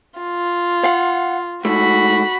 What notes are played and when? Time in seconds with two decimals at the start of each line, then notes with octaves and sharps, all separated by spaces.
0.20 F4
0.84 F5 F#5
1.65 G#2 A3 F#4 B5